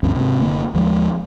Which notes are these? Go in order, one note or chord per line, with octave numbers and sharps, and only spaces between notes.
D2 G2 F3 C#4
G#2 C3
F#1 D3 A#3
D#2 F3 G#3